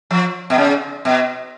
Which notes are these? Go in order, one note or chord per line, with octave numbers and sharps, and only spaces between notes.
F3
B2
C#3
B2